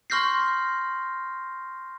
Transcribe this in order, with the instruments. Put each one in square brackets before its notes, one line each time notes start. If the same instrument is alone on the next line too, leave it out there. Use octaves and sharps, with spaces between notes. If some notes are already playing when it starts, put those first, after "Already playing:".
[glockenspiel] C6 C#6 F6 G6 A#6 C7